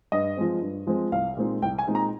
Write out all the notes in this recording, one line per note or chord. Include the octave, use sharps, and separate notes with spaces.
G2 D#5
F3 G#3 C4
G2
F3 G#3 C4
C2 F5
A#2 G#3 C4 D#4
C2 G5
G#5
A#2 G#3 C4 D#4
A#5